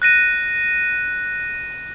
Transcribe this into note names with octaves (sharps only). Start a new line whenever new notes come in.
F#6 A#6 D#7